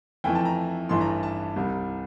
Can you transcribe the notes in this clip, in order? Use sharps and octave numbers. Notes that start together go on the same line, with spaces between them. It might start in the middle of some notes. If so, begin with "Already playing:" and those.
F2 E3 A3 G5
A5
A#5
A1 G2 E3 A3 C6
A#5
A5
C2 C3 G3